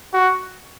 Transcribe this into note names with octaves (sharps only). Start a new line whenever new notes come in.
F#4